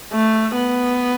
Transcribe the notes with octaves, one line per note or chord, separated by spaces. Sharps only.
A3
B3